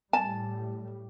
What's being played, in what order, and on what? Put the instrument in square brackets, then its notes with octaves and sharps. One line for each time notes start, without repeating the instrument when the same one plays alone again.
[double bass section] A2 G3 [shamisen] G#5 [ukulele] A5